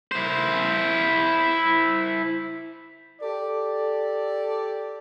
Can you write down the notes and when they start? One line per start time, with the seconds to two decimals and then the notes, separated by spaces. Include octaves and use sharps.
0.12 E4 C5
3.21 G4 A4 D5